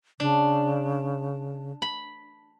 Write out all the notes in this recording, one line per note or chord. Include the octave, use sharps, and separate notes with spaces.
C#3 D4
B5